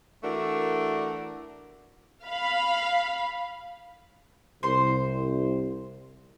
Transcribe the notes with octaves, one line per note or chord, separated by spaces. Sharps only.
E3 A3 D4 F#4 A#4
F5 B5
C2 C5 C6